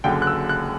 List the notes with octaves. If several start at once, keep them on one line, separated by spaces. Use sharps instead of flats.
F#1 F#2 D3 G5
F#6
E6
F#6